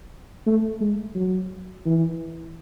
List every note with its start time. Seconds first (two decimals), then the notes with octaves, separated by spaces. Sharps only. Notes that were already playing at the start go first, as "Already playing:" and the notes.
0.47 A3
0.80 G#3
1.15 F#3
1.86 E3